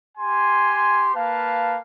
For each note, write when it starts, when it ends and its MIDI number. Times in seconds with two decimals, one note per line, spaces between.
0.18 1.11 67
0.18 1.11 80
0.18 1.11 84
1.15 1.77 58
1.15 1.77 71
1.15 1.77 77
1.15 1.77 81